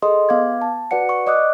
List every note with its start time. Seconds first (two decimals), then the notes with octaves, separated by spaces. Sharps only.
0.02 G#4 A4 D#5 C6 D#6
0.29 B3 F5 D6 G#6
0.61 A5
0.91 F#4 B4 D5 F#5 C#7
1.09 C#6
1.27 D5 D#5 D6 D#6 F#6